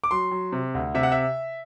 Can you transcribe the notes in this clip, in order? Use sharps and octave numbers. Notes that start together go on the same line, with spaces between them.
D6
F#3 C6
F#3
C3
D2
C3 E5
F#5
E5